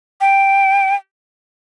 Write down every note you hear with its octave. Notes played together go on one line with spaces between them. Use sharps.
G5